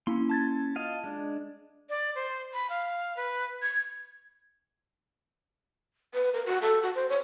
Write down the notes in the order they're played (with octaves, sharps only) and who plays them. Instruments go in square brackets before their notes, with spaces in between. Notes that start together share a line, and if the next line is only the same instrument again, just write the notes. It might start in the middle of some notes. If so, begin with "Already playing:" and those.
[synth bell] A#3 E4 [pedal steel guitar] C#4 C6
[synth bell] A5 G#6 A6
[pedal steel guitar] F4 D#5 F5
G#3 D4
[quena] D5
C5
B5
F5
B4
G#6
[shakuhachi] B4
A#4
F#4
A4
F#4
C5
C#5